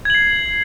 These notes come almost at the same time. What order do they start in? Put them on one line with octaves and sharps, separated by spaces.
G#6 F#7 C7